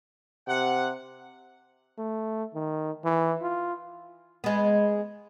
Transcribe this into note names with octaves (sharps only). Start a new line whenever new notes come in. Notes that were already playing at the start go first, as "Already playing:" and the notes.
C3 F#5
A3
D#3
E3
F4
G#3 B3